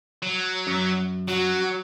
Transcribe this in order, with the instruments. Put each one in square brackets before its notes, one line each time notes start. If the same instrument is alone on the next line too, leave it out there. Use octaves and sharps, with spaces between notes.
[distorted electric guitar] F#3
[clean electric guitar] F#2
[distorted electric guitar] F#3 [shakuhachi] F#4